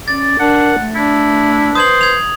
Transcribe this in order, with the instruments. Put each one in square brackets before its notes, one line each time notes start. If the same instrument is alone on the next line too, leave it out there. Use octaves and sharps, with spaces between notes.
[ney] C#4 [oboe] D5 [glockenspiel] A6
[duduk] D4 [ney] A#4 [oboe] F#5
[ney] A3
[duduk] D4 [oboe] E4
[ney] B4 [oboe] C5 [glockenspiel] D#6 G#6 F#7
[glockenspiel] G#6 F7